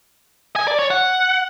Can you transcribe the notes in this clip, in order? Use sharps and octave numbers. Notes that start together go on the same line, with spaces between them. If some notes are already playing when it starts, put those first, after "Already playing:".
G#5
D5
C#5
F#5